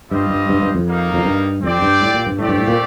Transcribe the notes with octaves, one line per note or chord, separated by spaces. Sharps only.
G2 G3 C4 F4 C5 D#5
G2
G2
G2
F2
G3 A#3 D#4 A#4 F5
F2
G2
F2 C4 G4 D5 G5
G2
A2
A#2
G2
A2 A3 C4 G4 D5
G2
A2
A#2